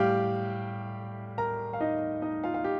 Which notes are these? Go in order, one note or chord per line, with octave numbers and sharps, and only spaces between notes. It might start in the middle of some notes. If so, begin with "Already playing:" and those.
Already playing: A2 G3 G4 F5 G5
A#4 A#5
F5
D#4 D#5
D#4 D#5
F4 F5
F5
G4